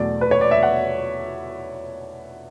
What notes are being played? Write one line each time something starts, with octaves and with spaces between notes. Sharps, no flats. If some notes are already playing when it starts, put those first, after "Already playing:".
Already playing: E2 B2 F#3 A3 D5
B4
C#5
D5
E5
F#5